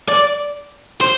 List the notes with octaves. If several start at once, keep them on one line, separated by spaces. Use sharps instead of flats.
D5
C5